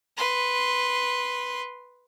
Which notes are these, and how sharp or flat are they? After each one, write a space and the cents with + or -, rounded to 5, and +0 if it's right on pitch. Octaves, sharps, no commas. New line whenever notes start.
B4 +0 C6 +0